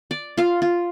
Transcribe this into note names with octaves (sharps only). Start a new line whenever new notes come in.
D5
F4 F5
F4